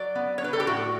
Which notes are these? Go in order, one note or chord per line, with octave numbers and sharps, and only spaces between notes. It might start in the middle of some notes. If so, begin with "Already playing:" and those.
Already playing: F#3 D5
B3
C#5
D4 B4
A4
G4
A2 F#4